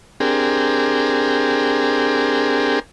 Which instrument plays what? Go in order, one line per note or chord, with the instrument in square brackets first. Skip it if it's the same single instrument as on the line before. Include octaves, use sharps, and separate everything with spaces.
[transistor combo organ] C4 D4 G4 G#4 A#4